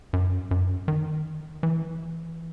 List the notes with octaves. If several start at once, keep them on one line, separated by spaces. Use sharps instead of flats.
F#2
F#2
D#3
E3